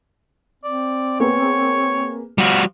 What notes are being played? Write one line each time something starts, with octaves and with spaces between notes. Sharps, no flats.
C4 D5
A#3 B3 G#4 C#5
F3 G3 F#4